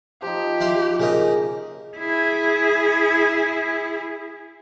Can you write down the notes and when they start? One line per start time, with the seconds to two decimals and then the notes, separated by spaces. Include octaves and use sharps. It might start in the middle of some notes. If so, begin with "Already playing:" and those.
0.22 F3 D#4 G4
0.60 E4 C5 F5
1.00 C#3 A#3 D#5
1.97 E4 G#4